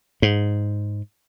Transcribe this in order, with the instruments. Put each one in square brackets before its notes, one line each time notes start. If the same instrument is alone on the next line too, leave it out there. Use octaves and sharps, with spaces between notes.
[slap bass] G#2